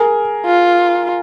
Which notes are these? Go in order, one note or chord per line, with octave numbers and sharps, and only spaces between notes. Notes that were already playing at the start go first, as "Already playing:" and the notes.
Already playing: G#4 A#4
F4